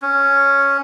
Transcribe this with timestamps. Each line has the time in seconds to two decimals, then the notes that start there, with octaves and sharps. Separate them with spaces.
0.02 C#4